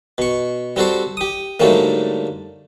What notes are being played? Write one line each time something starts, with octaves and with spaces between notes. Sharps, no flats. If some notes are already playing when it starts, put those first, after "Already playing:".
B2 C#6
G3 C4 F#4 A4 C5
G4 D#6
G#2 D3 F#3 G3 A3 A#3